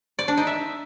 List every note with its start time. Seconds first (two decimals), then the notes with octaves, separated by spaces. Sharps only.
0.19 D5
0.28 D4
0.37 D#4
0.47 E5